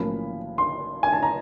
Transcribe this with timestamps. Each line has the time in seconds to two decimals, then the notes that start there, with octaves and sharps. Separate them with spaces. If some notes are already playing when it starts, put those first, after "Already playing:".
Already playing: B1 A2 F3 A#3 C#4 B5
0.58 C6
1.03 G#5
1.13 A5
1.23 A#5